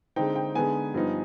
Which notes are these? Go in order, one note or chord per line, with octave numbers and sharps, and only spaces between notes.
D3 G#3 C4 D#4 G5
G5
D3 G#3 B3 D#4 G#5
G2 F3 B3 D#4